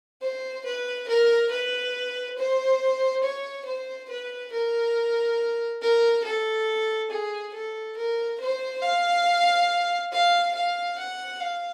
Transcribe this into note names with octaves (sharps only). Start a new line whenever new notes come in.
C5
B4
A#4
B4
C5
C#5
C5
B4
A#4
A#4
A4
G#4
A4
A#4
C5
F5
F5
F5
F#5
F5